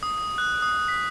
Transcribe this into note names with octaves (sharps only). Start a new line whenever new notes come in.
D#6
F#6
D#6
B6